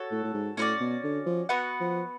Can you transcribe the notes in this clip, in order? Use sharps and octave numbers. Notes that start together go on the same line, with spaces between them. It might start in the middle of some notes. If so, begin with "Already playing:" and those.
Already playing: F#4 A4 C#5
A2
A2
G#2
A2 C#4 F#4 B4 D5
B2
D3
F3
B3 F#4 B4 F#5
F3